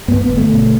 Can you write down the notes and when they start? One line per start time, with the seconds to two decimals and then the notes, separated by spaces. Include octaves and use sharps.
0.08 G2 B3
0.22 B3
0.30 G1
0.37 A3
0.52 B2